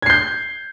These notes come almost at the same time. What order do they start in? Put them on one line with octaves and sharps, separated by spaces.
G#6 C7 G6